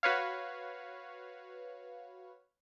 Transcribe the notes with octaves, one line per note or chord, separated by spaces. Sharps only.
F#4 B4 C#5 F5